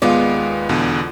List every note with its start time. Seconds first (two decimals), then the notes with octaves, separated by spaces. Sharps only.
0.02 D#2 G#3 B3 F4 D5
0.69 E2 B2 D3